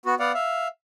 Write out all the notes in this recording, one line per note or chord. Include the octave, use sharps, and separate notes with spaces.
B3 F#4
B3 D5 F5 F#5
E5 F5